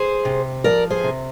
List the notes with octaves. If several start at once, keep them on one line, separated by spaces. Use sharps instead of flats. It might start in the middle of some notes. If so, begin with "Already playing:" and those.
Already playing: G#4 C5
C3
F3 A#4 D5
G#4 C5
C3